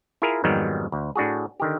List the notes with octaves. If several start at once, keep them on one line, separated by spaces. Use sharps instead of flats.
E4 F4 G#4 A#4
F2 G#2 D#3 F#3 G3 B3
D2
A2 D4 F#4 G#4
D3 D#3 G4